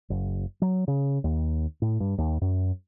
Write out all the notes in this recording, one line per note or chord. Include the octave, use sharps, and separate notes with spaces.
F#1
F#3
C#3
D#2
A2
G2
D#2
F#2